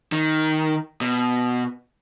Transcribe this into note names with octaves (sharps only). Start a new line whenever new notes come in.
D#3
B2